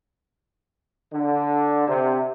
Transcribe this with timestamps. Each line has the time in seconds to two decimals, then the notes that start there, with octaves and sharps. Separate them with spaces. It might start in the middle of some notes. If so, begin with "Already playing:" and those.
1.13 D3
1.88 C3